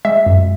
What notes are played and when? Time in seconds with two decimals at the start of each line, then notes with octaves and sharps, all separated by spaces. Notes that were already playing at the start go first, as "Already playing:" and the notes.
0.05 G#3 E5
0.26 F#2